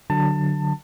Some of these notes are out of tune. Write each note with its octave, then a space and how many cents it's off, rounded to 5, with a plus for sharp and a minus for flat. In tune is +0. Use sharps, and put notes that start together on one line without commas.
D3 +0 F#3 +0 A5 +25